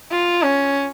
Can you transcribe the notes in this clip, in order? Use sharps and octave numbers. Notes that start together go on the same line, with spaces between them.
F4
C#4